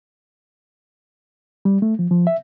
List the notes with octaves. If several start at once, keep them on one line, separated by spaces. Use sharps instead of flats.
G3
A3
F3
F3
E5